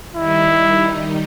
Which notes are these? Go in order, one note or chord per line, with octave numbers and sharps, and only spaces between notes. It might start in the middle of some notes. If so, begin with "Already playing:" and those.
D#3 G3 D#4 E4